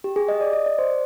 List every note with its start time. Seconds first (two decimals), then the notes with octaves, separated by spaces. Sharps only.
0.04 G4
0.16 G#4
0.28 D#5
0.41 D5
0.53 D#5
0.66 D5
0.79 C5